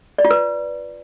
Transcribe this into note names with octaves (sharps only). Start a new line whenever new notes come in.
D5
F4
B4